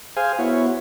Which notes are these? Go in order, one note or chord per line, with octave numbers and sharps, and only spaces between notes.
G#4 C5 F5 G#5
B3 E4 F#4 C#5